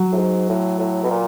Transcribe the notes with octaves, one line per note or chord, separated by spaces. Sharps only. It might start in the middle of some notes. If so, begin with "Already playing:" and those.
Already playing: F#3
A2
G#2
A2
A2
B2
A#2